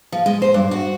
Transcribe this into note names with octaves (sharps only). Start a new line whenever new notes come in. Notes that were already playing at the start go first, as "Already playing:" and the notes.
F3
G#3
C5
G2
F#4